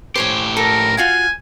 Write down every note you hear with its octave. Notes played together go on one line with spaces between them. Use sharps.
A2 G4 C5 C#5 G#5
A4 A#4
F4 F#4 F5 G#5